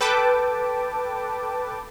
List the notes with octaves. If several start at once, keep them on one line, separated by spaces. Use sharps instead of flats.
A4 B4 G5 A5 D6